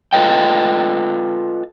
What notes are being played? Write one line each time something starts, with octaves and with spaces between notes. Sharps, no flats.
F4 A4 B4 D#5 G5